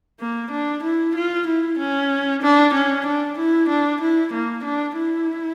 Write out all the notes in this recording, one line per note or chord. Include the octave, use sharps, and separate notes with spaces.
A#3
D4
E4
F4
E4
C#4
D4
C#4
D4
E4
D4
E4
A#3
D4
E4